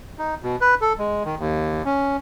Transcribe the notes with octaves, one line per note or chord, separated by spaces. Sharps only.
D#4
B2
B4
A4
G#3
D#3
D#2
C#4